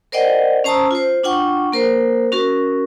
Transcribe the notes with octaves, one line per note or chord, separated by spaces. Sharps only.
A#4 C5 D5 D#5 F#5 G5
C#4 C5 A5 A#5 D#6 E6
F4 C5
D4 F4 F#5 G5 C#6
A#3 A#4 C5
C#4 F#4 A#4